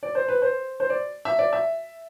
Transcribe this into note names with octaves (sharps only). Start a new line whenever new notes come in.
D5
C5
B4
C5
C5
D5
E5
D5
E5